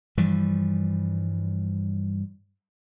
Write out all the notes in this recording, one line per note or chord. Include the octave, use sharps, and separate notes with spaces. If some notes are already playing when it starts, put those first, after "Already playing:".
G2 E3 F3 G3